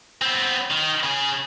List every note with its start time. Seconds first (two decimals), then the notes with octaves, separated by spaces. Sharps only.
0.22 B3 C4
0.71 D#3
1.03 C#3 G#4